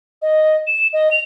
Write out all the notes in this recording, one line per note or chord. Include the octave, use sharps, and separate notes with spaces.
D#5
E7
D#5
F7